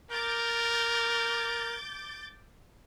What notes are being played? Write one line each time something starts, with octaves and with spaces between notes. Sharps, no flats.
A#4 D6 G6 A6